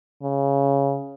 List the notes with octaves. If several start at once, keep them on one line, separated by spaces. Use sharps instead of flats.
C#3